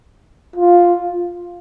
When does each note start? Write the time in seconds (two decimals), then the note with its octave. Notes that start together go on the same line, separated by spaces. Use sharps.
0.56 F4